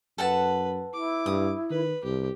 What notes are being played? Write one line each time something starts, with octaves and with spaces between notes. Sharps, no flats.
F#2 A4 B4 F#5 A5
E4 D6
G2 D#6
D#3 B4
C2 G4